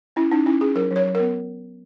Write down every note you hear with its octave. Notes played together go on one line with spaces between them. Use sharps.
C#4 E4
C#4 D#4
C#4 E4
C#4 G#4
F#3 A#4
F#3
C#5
F#3
A#4
B3